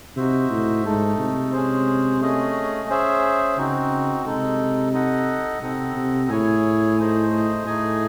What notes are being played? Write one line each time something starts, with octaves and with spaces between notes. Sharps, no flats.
C3 D#4 F#4 C5 E5
A2
G#2 A3 D#4 A4
C3
G#3 C#4 G#4 C5
A3 C#4 G#4 D#5
C#4 G#4 C5 E5
C#3 C4 D#4 F#4
C3 G#3 D#4 A4
D#4 A4 D#5 F#5
C3 C4 D#4 A4 D#5 F#5
C3
A2 E4 G#4 C#5 G#5
A3 D#4 G#4 C5 D#5
A2 A3 D#4 G#4 D#5 G#5